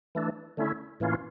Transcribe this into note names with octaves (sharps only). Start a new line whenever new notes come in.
E3 A3 D4
D3 A3 C#4 E4
A2 E3 A#3 C#4 F4